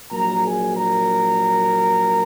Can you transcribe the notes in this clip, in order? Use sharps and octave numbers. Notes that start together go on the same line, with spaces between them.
A#1 A#2 F#3 A#4 A#5
G#4 G#5
A#4 A#5